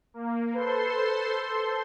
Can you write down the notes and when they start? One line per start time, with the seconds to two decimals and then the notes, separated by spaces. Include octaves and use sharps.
0.14 A#3
0.55 A4 B4 C5 C6